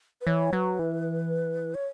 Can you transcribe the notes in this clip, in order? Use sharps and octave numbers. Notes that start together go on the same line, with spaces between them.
B4
E3 C#5
F#3 B4
E3
C#5